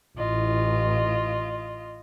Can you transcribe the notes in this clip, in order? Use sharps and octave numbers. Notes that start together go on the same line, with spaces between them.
A1 F4 D#5